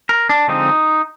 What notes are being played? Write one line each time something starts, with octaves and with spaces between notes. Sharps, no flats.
A#4
D4
D3 F3 G#3 C4 D#4